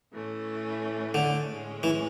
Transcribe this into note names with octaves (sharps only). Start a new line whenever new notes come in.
A2 E3 A3 C#4
D3
A2 G#3 C#4
E3